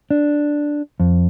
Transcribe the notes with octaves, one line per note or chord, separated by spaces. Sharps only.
D4
F2